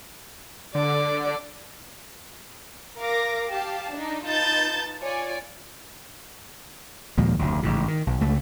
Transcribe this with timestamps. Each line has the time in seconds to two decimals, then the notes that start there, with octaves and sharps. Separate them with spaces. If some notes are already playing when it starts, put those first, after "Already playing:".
0.75 D3 D5
2.97 A#4 F5 D6 A#6
3.51 G4 F5 A5
3.93 D4 D#4
4.26 D#4 F4 B4 A5 G6 A6
5.02 F4 C#5 D5 G#5
7.18 D#2 A#2 F3 G#3
7.39 F1 D2
7.63 A1 G#2 C#3
7.88 D#3
8.07 B1
8.21 C#2 A3